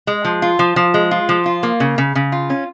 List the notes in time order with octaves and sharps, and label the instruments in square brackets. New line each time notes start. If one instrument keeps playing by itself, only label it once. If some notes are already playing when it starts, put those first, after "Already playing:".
[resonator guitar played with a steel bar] G#3
F3
F4
F3
F3
G#3
F4
F3
F4
A#3
C#3
C#3
C#3
F4
C#4